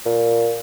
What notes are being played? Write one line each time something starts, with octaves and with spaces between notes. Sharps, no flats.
A#2